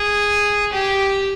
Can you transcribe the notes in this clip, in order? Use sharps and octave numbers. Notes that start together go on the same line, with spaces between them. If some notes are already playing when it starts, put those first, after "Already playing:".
Already playing: G#4
G4